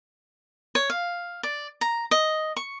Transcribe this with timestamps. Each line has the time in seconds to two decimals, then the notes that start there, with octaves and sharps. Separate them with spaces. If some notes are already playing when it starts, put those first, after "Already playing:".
0.75 C#5
0.90 F5
1.43 D5
1.81 A#5
2.11 D#5
2.57 C#6